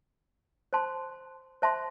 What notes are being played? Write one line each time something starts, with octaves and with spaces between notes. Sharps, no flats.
C5 A5 C6
C5 E5 A5 C6